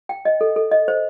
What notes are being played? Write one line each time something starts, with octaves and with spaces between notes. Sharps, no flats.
G5
D#5
A4
A4
D#5
C5